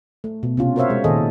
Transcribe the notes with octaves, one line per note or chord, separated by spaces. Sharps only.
A3
B2
C3 C#4 F4
F#4 A#4 C5 C#5 E5 F5
G#3
A#2 D#3 G#4 A4 D#5